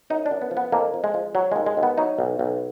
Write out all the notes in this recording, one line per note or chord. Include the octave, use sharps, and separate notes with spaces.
F#2 D#4
D4
F#2
B3
F3
B3
F2 A#3
F2
G#3
F3
F#3
D#2 G#3
G#3
D#2
B3
F#3 D#4
B1
B1